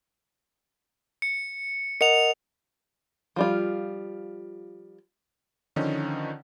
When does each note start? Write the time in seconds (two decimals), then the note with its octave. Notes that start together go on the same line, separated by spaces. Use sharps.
1.22 C#7
2.01 A#4 D#5 F#5 C#7 F7
3.36 F3 G3 F4
5.76 D3 D#3 F3 C#4 D#4